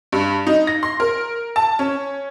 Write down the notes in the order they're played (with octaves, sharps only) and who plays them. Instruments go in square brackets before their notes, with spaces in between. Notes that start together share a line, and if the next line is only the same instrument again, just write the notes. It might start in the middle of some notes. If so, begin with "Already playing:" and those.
[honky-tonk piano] G2
D#4
A#6
C6
A#4
A5
C#4